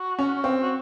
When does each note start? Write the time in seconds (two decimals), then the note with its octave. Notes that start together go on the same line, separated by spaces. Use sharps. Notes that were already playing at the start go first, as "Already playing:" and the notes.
Already playing: F#4
0.19 C#4
0.44 C4
0.62 F#4